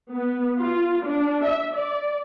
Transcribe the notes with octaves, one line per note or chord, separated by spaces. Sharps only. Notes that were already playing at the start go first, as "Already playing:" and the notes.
B3
F4
D4
E5
D5